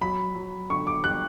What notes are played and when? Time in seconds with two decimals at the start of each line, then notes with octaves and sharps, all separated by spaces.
0.01 F#3 B5
0.35 F#3
0.70 D3 C#6
0.87 D6
1.04 G3 F#6